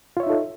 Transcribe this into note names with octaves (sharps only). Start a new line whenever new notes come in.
D#4 F4 A4 C#5 E5